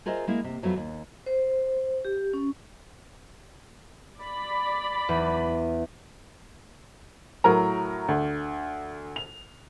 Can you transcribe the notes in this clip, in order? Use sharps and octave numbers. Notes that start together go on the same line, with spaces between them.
F4 G#4 A#4 C5 D#5 E5
G#3 A#3 E4
C3
F2 F#3 A3 B3 F4
D#2
C5
G4
C#4
D5 B5
E2
A2 F#3 A#4 A#5
D2
F7